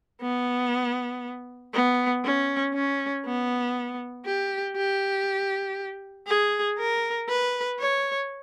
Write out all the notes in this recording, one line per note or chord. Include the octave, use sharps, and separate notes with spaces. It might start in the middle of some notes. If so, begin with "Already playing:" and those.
B3
B3
C#4
C#4
B3
G4
G4
G#4
A#4
B4
C#5